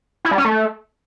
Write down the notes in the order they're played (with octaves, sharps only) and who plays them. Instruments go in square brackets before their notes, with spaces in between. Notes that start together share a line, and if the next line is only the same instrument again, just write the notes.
[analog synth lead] E4
G3
C#4
A3